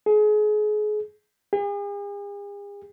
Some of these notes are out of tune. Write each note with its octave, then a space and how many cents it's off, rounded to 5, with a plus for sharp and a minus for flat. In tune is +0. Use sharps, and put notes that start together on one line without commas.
G#4 +30
G#4 -45